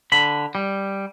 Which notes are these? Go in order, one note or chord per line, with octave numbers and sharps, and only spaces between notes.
D3 B5
G3